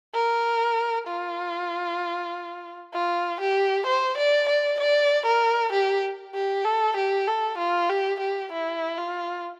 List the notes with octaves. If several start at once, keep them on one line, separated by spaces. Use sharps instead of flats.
A#4
F4
F4
G4
C5
D5
D5
D5
A#4
G4
G4
A4
G4
A4
F4
G4
G4
E4
F4